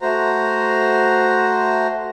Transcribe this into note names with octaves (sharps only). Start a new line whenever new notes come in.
A3 F#4 C5 A#5